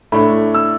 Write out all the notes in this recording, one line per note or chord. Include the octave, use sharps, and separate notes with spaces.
A2 A3 D4 B5
E6